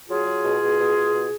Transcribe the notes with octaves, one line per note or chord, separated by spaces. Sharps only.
F#3 F4 G#4
F#3
B2
B2
B2
B2
B2